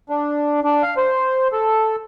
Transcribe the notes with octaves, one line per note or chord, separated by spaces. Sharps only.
D4
D4
F5
C5
A4